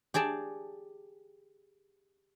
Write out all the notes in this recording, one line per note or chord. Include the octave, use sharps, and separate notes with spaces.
G4 G#4 D5 A5